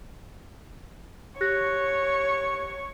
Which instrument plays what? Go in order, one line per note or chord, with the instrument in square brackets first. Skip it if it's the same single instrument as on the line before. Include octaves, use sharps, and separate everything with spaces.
[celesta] G4 F#6 A#6 [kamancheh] C#5 C#6